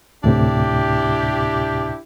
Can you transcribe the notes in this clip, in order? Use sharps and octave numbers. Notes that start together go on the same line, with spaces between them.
D2 A2 C3 D4 E4 G4